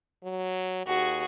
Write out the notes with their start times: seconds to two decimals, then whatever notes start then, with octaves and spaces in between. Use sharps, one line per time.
0.23 F#3
0.86 D#2 F#4 G#4